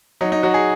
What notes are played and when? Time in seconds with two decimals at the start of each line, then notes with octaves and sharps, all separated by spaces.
0.21 F#3 D#4
0.32 D#4
0.43 F#3 F#4
0.54 G#4